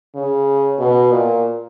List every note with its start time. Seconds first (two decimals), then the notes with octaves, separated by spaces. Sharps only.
0.15 C#3
0.79 B2
1.11 A#2